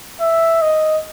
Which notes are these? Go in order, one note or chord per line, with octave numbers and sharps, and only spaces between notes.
E5
D#5